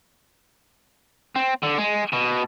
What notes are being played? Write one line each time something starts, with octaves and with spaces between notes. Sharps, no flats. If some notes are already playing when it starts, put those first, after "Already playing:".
C4
D3
G#3
B2